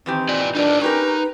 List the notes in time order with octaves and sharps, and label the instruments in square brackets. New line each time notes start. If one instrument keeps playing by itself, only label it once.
[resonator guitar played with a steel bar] D#3 E3 G4 [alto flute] C4
[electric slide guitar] F4 D5
[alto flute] D4 [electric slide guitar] D#4 F4 A#4
[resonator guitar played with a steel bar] C#4 G4 A#4 [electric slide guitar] D#4 [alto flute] B4